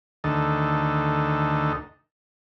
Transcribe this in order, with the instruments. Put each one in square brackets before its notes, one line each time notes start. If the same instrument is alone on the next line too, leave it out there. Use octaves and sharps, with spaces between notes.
[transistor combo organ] D2 D#3 A4